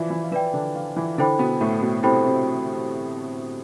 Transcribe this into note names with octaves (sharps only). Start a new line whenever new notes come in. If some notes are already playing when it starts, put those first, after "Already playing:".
Already playing: E3 F3 E4 B4 D5
E3 E4
F4
E3 E4 B4 D5 G5
D3 D4
F3 F4
E3 E4
D3 D4 E4 A4 C5 G5 B5
B2 B3
A2 A3
B2 B3
C3 C4 E4 A4 C5 G5 B5
C3 C4